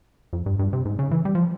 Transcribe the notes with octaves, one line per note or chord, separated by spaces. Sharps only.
F2
G2
G2
C3
G#2
C#3
E3
G3
F3